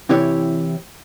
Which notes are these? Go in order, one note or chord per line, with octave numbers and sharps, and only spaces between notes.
C3 E3 E4 G4 C#5 D5